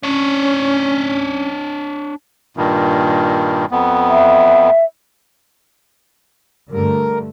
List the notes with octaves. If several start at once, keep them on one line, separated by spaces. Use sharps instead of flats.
C#4 D4 C#5
G2 A#2 D#3
F2 B3
E5
G2 D3 A3 A#4